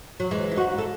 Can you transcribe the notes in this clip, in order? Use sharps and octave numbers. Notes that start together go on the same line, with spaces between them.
F#3
E3 G#3
E4
D#4 F#4
A4